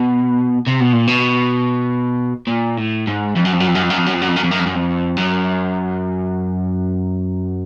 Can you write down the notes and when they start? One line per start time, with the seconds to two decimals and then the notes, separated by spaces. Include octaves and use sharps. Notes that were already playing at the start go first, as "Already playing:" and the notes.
Already playing: B2
0.67 C3
0.81 B2
0.94 A#2
1.07 B2
2.47 A#2
2.77 A2
3.08 G#2
3.36 F2
3.45 F#2
3.53 F2
3.60 F#2
3.68 F2
3.75 F#2
3.83 F2
3.90 F#2
3.97 F2
4.06 F#2
4.14 F2
4.21 F#2
4.28 F2
4.36 F#2
4.44 F2
4.51 F#2
4.59 F2
4.66 F#2
4.75 F2
5.17 F#2